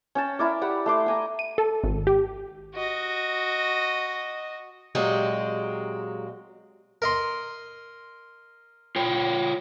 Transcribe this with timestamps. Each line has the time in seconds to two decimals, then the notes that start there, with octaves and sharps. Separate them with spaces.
0.15 C#4 G5 A5
0.39 E4 A#4 D5
0.61 G4 D5 F#5 B5
0.86 A3 C6 D6
1.06 G5 G#5 A#5
1.39 D#7
1.58 A4
1.84 G#1
2.07 G4
2.74 F#4 D#5
4.95 A#2 F#3 G#3 C4 G4 G#4
7.02 A#4 D#5 C6
8.96 F4 C#5 G5